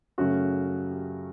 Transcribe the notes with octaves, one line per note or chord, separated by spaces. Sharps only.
F#2 C#3 F#3 A3 C#4 F#4
G4